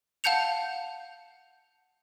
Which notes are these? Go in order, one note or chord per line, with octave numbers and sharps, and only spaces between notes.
F5 F#5 A5 G6 C#7 F7